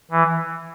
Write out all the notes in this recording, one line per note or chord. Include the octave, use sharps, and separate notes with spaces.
E3